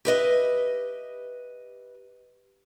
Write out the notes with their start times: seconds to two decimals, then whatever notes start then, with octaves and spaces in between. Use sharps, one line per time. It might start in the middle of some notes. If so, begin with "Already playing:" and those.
0.05 G4 B4 D#5 E5